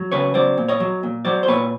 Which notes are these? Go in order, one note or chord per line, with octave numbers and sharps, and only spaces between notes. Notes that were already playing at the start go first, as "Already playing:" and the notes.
Already playing: F#3
C#3 B4 C#5
F#3 C5 D5
A#2
C#5 D#5
F#3
A#2
F#3 C5 D5
C5
A#2 B4 C#5